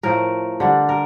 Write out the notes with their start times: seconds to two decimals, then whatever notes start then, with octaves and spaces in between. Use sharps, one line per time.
0.03 A2 F3 A3 A#4
0.60 D3 G3 D4
0.89 A#4